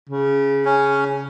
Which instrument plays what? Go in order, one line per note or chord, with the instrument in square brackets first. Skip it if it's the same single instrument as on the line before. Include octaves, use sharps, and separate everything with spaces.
[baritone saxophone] C#3
[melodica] C#4